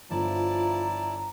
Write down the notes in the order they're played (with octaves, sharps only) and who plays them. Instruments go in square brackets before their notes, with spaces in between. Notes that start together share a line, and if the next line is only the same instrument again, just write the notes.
[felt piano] G1 [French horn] F3 [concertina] E4 D5 A5 [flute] A#5